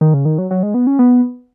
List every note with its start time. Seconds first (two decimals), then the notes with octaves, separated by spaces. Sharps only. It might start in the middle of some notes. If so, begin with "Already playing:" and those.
0.01 D#3
0.14 C#3
0.25 D#3
0.38 F#3
0.51 F#3
0.63 G#3
0.74 B3
0.87 C#4
0.99 B3